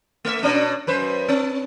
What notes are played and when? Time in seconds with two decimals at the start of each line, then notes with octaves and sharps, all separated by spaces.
0.25 A3 E5
0.43 B2 C#4 D4
0.87 F#2 B4 C5
1.28 C4